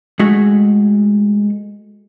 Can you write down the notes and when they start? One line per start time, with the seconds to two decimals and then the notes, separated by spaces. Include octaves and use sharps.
0.19 G#3 A3 F#4 G#4